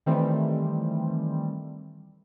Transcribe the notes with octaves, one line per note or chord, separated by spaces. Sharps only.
D#3 E3 G3 A3 C4